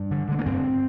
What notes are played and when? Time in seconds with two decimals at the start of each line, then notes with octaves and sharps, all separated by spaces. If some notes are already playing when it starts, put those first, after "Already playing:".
Already playing: G2
0.11 D3
0.29 D3 G#3
0.39 A#3
0.46 G2 C4